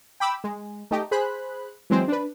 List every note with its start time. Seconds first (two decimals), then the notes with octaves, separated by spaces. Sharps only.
0.20 G5 B5 D6 E6
0.44 G#3
0.91 A3 D#4 G4
1.11 G#4 C5 B5 F#6
1.90 E3 F#3 G#3 C4 C5
2.08 D4 B4